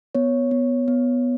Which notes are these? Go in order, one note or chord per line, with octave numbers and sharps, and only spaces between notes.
B3 C#5
B3
B3